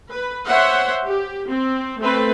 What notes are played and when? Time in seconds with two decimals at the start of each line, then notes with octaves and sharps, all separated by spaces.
0.12 B4
0.48 C5 C#5 E5 F#5
1.06 G4
1.51 C4
2.01 A3 C4 B4